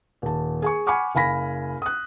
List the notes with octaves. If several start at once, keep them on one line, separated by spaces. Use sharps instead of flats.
D#1 A5
G#4 G#5 C#6
F#5 G#5 B5 C#6 D6 F6
F#1 F5 G#5 B5 A#6 B6
D#6 F#6